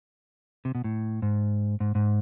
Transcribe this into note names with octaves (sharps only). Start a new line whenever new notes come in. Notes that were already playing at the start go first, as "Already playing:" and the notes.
C3
B2
A2
G#2
G#2
G#2